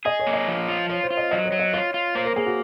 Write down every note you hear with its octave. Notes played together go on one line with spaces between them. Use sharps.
G#4 D#5
C#5
A#3
D#5
F3
F4
F4 C#5
C5
F4
D#5
F#3 D#5
C#5
F#3
D#5
F4 C#5
F4
A#3 C5
A#4
A#3 G#4
F#4